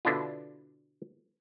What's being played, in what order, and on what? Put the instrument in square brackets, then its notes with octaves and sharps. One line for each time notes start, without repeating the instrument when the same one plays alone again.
[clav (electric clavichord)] B2 D3 D4 E4 F4